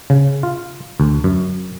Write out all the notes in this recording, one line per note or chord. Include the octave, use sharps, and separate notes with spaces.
C#3
F4
D2
F#2